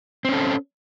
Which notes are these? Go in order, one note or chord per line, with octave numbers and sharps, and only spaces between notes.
C4 C#4 A4